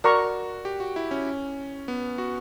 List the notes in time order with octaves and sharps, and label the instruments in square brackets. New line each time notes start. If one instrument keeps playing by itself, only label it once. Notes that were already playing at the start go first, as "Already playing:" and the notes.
[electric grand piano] F#4 [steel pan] A#4 D5 A#5 C#6
[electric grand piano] G4
F#4
E4
C#4
B3
F#4